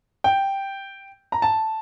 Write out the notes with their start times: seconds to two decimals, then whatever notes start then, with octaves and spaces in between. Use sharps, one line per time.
0.24 G5
1.32 A#5
1.42 A5